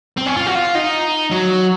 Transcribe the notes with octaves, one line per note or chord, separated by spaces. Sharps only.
C4
C#4
F4
F#4
F4
D#4
F#3